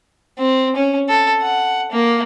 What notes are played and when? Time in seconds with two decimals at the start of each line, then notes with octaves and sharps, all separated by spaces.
0.39 C4
0.76 C#4
1.09 A4
1.42 F#5
1.92 A#3